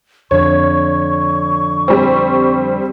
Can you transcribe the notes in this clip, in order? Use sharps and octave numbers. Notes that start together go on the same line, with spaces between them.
F2 D3 D4 C#5 C#6
G3 C4